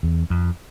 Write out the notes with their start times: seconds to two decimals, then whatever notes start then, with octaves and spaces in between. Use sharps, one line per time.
0.03 E2
0.30 F2